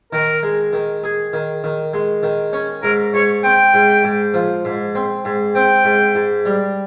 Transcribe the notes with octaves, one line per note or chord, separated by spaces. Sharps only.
D#3 A#4
G#3
D#3
G#4
D#3
D#3
G#3
D#3
C#4
G#2 A#4
G#2 C#5
C4 G5
G#2
G#2
F3
G#2
C4
G#2
C4 G5
G#2
G#2
G3